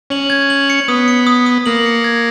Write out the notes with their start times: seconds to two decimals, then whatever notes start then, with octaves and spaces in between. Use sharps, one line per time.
0.10 C#4 F#7
0.30 G#6
0.50 F#7
0.70 C#7
0.88 B3 D#6
1.08 C#7
1.27 D#6
1.46 D#6
1.66 A#3 F#7
1.86 C#7
2.04 G#6